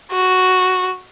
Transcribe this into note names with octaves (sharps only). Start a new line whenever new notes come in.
F#4